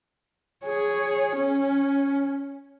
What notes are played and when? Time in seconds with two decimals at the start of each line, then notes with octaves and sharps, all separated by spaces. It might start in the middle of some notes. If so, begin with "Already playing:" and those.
0.65 G#4 C#5
1.36 C#4